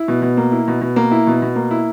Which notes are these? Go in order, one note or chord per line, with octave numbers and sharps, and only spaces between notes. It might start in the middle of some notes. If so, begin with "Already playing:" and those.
Already playing: E4
B2
B2
A#3
E4
B2
B2
A#3
E4
B2
B2
A#3
E4